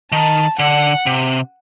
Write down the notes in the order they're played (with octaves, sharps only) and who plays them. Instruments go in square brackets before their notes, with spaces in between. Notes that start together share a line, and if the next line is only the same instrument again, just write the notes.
[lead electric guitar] D#3 [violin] A5
[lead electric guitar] D3 [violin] F#5
[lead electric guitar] C3